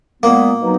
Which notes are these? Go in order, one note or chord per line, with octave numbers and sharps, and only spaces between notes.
A#2 G#3 A#3 B3
B2 F#3 B3 D#4